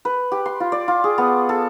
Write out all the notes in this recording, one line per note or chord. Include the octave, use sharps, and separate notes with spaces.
B4
G4
C6
F4
D5
F4
G#4
B3
A4